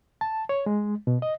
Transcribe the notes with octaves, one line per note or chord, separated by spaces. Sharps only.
A5
C#5
G#3
B2
D#5